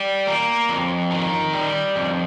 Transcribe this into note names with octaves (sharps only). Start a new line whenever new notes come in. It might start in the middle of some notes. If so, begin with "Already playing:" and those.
Already playing: G3
A#3
F2
D#3
G3
F2